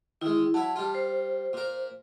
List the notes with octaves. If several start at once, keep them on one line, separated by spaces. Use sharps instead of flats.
D#3 G#3 E4
F#3 E4 A5
G3 F4
C5
A#2 A#4